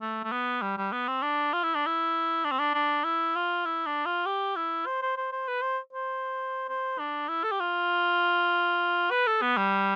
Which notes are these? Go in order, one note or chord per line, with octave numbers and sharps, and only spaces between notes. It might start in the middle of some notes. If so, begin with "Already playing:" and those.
A3
A3
B3
G3
G3
B3
C4
D4
F4
E4
D4
E4
D4
C4
D4
D4
E4
F4
E4
D4
F4
G4
E4
C5
C5
C5
C5
B4
C5
C5
C5
D4
E4
A4
G4
F4
B4
A4
B3
G3